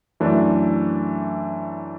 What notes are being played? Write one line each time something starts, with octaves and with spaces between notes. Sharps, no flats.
F#2 E3 A3 D4